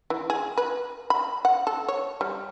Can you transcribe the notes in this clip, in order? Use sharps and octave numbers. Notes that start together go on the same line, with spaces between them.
E3
G#4
B4
B5
F#5
A4
C#5
G3